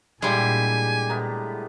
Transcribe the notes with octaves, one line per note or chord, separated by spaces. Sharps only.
A#2 D3 G3 G#3 E4 G4 G#5
A2 B3 A#5